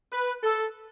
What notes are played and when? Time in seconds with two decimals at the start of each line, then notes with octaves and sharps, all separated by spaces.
0.12 B4
0.43 A4